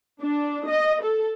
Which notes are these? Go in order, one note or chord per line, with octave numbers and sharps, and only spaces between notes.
D4
D#5
A4